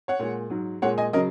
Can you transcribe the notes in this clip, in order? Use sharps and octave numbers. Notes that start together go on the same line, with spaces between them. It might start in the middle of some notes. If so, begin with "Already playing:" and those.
C#5 F#5
A#2 G#3
G#2 F#3
A#2 G#3 C#5 F#5
D#5 G#5
C#3 F#3 A#4 D#5